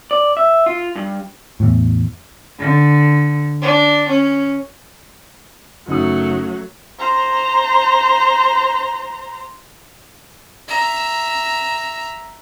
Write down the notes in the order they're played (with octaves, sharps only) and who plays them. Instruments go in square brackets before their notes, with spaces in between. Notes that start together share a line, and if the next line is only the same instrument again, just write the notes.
[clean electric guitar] D5
E5
F4
G2
[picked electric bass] E2 A2
[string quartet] D3
D4
C#4
[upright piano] F#1 D#4 D#6 [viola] F#3 A3
[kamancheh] C5 A#5
[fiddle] E5 A#5